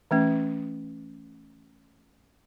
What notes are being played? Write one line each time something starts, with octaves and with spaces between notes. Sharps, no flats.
E3 A3 C#4